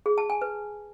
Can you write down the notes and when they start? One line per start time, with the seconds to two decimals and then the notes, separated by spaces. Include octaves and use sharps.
0.06 G#4
0.18 A5
0.30 G#5
0.42 B4